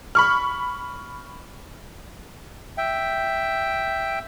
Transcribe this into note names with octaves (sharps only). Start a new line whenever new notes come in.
B5 C#6 F6
E5 G5